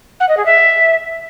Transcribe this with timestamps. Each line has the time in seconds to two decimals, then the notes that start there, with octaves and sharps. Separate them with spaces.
0.20 F#5
0.29 D#5
0.37 G#4
0.46 E5